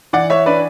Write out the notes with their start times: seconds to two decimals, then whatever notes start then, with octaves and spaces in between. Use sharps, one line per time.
0.13 E3 D5 F#5
0.30 C#5 E5
0.46 D4 B4 D5